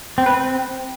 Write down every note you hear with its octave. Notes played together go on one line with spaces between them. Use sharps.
C4
B4
C4